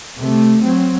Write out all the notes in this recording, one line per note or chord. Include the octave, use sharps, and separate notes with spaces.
C3 A3
F#3 C4